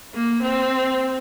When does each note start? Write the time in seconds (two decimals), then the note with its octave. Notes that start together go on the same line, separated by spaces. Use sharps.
0.15 A#3
0.43 C4